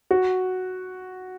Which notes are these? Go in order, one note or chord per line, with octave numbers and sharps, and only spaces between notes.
F#4